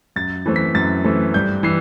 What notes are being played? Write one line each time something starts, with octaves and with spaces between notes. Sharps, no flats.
F#2 A6
E3 A3 C4
B6
F#2 A6
E3 A3 C4
G2 G6
E3 C7